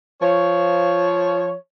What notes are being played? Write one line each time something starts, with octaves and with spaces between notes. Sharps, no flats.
F3 C#5